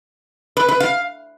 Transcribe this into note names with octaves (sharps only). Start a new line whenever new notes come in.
B4
B4
F5